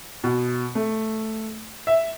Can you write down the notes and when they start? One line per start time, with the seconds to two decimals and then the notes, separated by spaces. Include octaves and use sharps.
0.24 B2
0.75 A3
1.87 E5